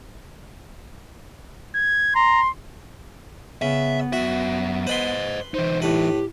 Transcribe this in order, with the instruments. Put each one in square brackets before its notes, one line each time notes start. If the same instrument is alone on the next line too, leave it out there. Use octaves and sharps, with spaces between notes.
[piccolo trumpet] G#6
[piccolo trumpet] A#5 [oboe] C6
[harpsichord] C#3 [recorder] B3 [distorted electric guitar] E5
[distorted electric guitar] F#2 E5 [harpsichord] F#4
[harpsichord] B4 B5 C6 [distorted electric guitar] C5 D#5
[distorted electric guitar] E3 D#4 [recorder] C5
[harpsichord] A2 B4 [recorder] G4